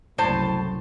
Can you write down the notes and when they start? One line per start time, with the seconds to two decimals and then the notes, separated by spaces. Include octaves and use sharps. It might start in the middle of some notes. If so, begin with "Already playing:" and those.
0.18 F#1 C2 A2 C5 A5